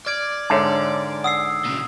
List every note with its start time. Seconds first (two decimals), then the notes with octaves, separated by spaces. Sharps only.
0.07 D5 F6 G#6 D7
0.50 G#2 D3 C#5 E5 A5
1.24 F#5 D#6 E6 C7
1.65 A#2 C#3